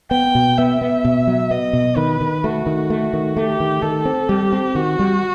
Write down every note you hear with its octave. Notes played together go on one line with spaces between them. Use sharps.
B3 G5
B2
B3 E5
B3
B2
F#3
B3 D#5
B2
D#3 B4
D#3
A3 F#4
D#3
A3
D#3
A3 G4
D#3
D#3 A4
C4
G3 G4
C4
D#3 F#4
G3